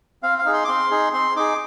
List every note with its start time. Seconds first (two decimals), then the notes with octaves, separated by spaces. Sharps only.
0.23 C4 F5
0.38 F5
0.45 D#4 G#4
0.54 C6
0.64 D6
0.68 C4 C6
0.91 D#4 G#4
1.13 C4 C6
1.36 D#4 G#4 D6